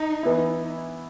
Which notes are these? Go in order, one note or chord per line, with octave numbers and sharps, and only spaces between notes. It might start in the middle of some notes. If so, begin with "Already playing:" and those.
Already playing: D#4
E3 B3 E4